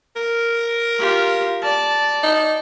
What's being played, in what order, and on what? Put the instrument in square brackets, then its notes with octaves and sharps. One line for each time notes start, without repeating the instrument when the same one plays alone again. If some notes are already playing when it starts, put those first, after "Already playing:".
[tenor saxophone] A#4
[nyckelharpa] F4 G4
D5 A5
[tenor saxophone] D#4